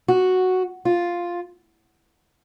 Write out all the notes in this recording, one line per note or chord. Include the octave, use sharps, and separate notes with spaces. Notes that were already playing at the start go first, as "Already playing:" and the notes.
F#4
F4